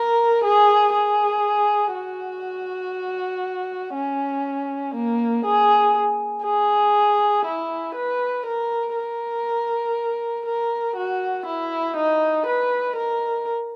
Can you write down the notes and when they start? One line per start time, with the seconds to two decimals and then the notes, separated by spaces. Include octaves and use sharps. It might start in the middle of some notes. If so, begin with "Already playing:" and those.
Already playing: A#4
0.44 G#4
0.94 G#4
1.94 F#4
3.95 C#4
4.95 A#3
5.45 G#4
6.45 G#4
7.45 E4
7.95 B4
8.45 A#4
8.95 A#4
10.46 A#4
10.96 F#4
11.46 E4
11.96 D#4
12.46 B4
12.96 A#4